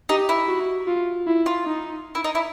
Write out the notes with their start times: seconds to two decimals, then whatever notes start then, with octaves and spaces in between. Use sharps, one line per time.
0.09 D#4 G4
0.29 E4
0.49 F#4
0.88 F4
1.27 E4
1.46 F4
1.66 D#4
2.15 E4
2.24 D#4
2.35 E4